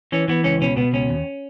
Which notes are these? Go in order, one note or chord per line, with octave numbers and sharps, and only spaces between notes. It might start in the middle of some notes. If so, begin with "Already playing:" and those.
E3 C#4
E3 B3
C#2 C#4
B2 C#4
B2 B3
C#2 C#4
D#2